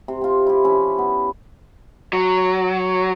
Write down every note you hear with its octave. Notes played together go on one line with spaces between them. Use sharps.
C3
C4 F4
E4 G4
F3 C#4 E4 E5
B3
F#3